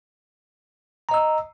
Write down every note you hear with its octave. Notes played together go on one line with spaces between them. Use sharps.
D#5 A#5 E6